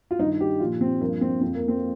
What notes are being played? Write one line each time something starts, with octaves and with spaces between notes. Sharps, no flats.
F4
G2 D#3 D#4
G4
A#2 F3 F4
C4
G2 F3 A#3
C4
F2 F3 C4
A#3
C4